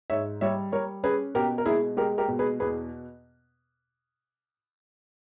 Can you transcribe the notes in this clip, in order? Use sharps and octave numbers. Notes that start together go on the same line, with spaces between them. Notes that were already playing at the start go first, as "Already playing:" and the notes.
G#2 C#5 E5
G3 C#5 E5
G3 A#4 C#5
C#4 G#4 B4
B2 G4 A#4
A#4
G#3 E4 G#4
G#3 G4 A#4
G4 A#4
B2
G#4 B4
E2 G#4 B4